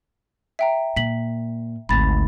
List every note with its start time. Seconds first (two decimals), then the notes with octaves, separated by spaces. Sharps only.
0.59 E5 G5 A#5
0.96 A#2 B6 F#7
1.89 G#1 D2 B5 A6